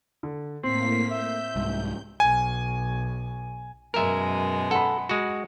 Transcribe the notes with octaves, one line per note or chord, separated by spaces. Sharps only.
D3
A2 A#3 C4 B6 C7
E5 G6
C2 G#2
B1 G#5
F#2 B2 G#3 A#4 E5
A4 F#5 B5
G#3 F#4